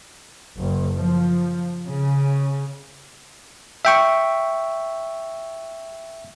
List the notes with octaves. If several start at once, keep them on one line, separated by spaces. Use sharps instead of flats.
F#1
F3
C#3
E5 G5 C#6